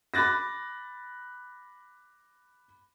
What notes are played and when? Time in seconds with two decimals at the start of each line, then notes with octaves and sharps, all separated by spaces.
0.14 B5 D6 F#6 A6 A#6